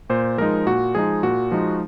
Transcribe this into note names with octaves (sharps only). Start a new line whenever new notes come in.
A#2 C5
F3 G#3 D#4 A#4
A#2 F#4
F3 G#3 D#4 G#4
A#2 F#4
F3 G#3 D#4